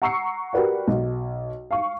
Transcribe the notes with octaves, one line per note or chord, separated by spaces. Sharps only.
F#5 A#5 C#6 E6 C7 C#7
F#4 G4 A#4 B4 D5 F#5
B1
F5 C#6